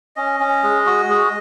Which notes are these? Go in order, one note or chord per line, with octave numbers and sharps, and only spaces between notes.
C#4 D#5
C#4
G#3
F#4
G#3